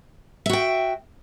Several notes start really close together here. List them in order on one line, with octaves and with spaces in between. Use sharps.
E5 F#4 G5